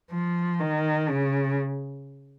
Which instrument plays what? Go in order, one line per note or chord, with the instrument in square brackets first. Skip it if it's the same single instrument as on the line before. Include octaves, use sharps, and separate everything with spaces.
[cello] F3
D#3
C#3